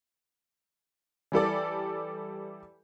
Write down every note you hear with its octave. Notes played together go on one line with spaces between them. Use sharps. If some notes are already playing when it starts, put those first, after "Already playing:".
E3 G3 A4 D5